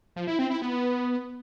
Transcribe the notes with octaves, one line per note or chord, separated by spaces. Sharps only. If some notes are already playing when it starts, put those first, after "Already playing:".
F3
E4
C4
E4
B3